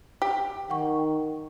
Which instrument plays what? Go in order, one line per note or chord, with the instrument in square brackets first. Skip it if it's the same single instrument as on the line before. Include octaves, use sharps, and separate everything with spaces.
[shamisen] G4
[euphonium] D#3 [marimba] F#5 G5 C#6